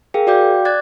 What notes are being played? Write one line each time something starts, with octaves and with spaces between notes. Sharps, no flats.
G#4 A#4 F5 G5
F#4 D5 F5 G5 D6 G6
D5 D6 F#6 G#6 A6